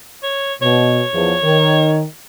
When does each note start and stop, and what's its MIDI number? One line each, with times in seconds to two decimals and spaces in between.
0.23 0.54 73
0.62 1.01 47
0.62 2.00 73
1.13 1.33 40
1.13 1.33 53
1.44 2.03 51